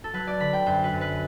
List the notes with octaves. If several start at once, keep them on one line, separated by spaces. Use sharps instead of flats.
A4
F#3 B4
D5
D3 B5
G5
F#2 C5
B4
F#2
B4